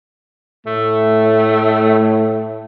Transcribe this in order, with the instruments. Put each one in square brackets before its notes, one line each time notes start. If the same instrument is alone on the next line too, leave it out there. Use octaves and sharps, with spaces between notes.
[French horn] A2 [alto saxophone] A3